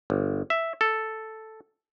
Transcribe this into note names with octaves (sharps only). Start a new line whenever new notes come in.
G1
E5
A4